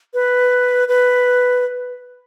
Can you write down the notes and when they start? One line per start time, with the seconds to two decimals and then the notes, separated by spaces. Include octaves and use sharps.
0.14 B4
0.88 B4